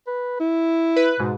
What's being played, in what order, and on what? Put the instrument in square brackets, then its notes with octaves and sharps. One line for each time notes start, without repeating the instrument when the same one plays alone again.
[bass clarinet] B4
E4
[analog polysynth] B4
[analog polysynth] G#2 [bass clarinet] B2